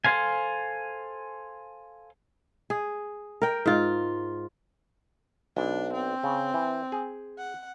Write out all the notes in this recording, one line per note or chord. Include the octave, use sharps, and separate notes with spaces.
A4 C5 F5 G#5
G#4
A#4 G5
G#2 F4
B1 D4
C4
C#3
E3
G#4
F#5